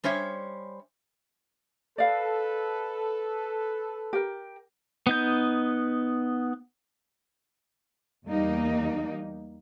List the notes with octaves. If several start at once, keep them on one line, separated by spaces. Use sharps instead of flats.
G3 C#4 C5 C#5 E5
A4 B4 D5 F5
G4 A#4
B3 D#4 G6
E2 G3 A#3 D#4